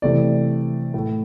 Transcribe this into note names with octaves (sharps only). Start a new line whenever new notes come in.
C3 E3 A3 D5
A2 A3